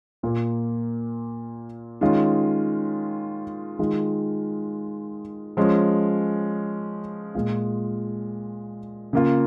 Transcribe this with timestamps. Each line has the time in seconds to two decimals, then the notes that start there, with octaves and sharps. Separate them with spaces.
0.23 A#2 A#3 F4
2.01 D#3 G#3 C#4 F4
3.79 D#3 G#3 F4
5.57 F3 G#3 C#4
7.35 A#2 G#3 F4
9.13 C#3 A#3 F4